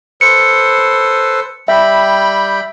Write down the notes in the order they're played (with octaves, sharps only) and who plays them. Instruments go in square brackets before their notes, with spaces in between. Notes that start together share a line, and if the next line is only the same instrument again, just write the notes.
[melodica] A4 B4 C5 [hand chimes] C#7
[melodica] G3 G5 B5 [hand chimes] E5